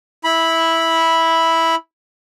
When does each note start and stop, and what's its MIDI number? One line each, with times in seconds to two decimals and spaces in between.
0.24 1.75 64
0.24 1.75 83